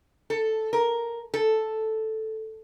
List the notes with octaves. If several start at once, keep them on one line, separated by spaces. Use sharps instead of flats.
A4
A#4
A4